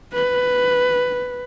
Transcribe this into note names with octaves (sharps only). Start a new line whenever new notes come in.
B4